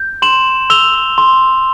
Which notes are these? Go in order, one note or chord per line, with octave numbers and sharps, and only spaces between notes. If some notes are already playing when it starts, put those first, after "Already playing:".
Already playing: G6
C6 E7 F#7
E6 F7 G7
C6